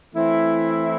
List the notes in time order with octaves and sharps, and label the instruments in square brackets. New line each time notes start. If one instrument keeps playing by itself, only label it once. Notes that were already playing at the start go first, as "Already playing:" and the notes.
[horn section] E3 A3 C4 E4